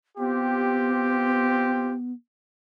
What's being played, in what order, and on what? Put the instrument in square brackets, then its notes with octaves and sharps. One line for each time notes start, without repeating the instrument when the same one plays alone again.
[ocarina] B3 [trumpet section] C4 F4 G4